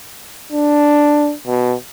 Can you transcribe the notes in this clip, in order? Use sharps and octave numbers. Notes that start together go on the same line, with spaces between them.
D4
B2